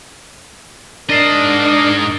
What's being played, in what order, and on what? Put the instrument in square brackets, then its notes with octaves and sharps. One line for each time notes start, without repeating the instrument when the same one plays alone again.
[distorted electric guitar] G#2 D#5 [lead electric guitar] D4 [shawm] A#4 [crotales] A6 C7